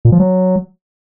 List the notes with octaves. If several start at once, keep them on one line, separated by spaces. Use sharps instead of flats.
A#2
F3
F#3